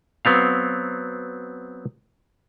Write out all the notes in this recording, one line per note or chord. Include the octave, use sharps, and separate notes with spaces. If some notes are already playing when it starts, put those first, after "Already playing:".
F#3 B3 C4 F5